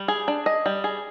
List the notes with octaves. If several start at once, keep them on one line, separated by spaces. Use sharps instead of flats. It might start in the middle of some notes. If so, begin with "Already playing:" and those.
Already playing: G3
G#4
D4
D#5
G3
G#4